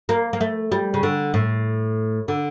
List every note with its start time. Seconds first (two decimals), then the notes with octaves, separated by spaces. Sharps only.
0.09 A#3
0.33 A#3
0.41 A3
0.72 G3
0.94 C#3
1.03 D3
1.34 A2
2.28 D3